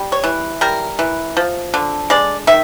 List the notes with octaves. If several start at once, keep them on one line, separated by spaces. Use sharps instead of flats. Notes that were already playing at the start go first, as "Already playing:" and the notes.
Already playing: G3
C#5
E3
G3 A#4
E3
F3
D3
G#3 D5
D#3 E5